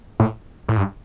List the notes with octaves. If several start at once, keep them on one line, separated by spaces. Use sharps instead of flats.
A2
A2
G2